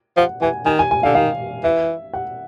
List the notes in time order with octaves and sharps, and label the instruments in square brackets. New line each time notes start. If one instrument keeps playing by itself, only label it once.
[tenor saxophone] F3 [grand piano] F#5
[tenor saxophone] E3 [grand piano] G#5
[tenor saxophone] D#3 [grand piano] G#5
[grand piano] G#5
G#5
[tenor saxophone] D3 [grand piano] F5
[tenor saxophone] D#3 [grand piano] F5
[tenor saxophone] E3 [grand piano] E5
[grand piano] F#5